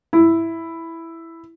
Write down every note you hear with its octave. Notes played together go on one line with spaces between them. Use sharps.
E4